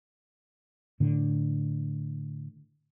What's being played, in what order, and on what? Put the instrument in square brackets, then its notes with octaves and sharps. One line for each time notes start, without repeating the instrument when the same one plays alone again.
[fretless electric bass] A2 D3